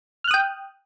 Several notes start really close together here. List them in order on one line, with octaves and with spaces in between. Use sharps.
F6 F#6 D#6 G5